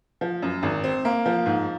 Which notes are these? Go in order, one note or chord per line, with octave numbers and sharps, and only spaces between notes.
F3
F#2
G#1
C4
A#3
F3
G#2